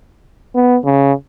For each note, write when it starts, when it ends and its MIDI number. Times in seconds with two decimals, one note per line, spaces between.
0.55 0.78 59
0.85 1.12 49